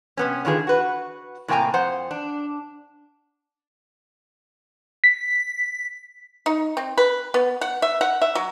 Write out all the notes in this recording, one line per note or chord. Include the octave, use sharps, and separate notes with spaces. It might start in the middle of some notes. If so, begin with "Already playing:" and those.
C3 B3 C#4
D3 D#3 F4 G#4 B4
F#4 B4
A2 C3 A#3 G5 G#5 A#5
F2 C5 F#5
D4
B6
D#4
C4
B4
B3
F#5
E5
F#5
E5
F#3